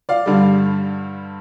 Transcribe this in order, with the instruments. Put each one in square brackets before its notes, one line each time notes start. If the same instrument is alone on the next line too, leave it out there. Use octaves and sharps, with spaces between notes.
[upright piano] D5 F5
G2 D3 G3